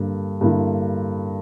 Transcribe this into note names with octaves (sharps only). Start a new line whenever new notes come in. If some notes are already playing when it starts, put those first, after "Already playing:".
Already playing: G2 D3 A#3
G2 D3 A#3 E4